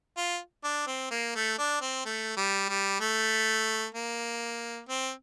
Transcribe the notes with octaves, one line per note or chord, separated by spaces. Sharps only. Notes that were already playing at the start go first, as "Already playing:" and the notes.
F4
D4
C4
A#3
A3
D4
C4
A3
G3
G3
A3
A#3
C4